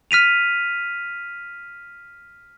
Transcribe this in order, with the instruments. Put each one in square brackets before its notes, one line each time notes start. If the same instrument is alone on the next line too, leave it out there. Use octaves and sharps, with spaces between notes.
[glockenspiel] F6 B6 D#7 F7